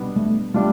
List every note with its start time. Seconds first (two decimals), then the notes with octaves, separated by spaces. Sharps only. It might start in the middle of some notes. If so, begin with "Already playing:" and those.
Already playing: B2 G3 B3 D4
0.16 A3
0.54 G3 A3 D4 F4